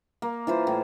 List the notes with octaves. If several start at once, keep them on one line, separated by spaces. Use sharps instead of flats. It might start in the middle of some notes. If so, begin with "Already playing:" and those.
A#3
E3 F4 C5
A2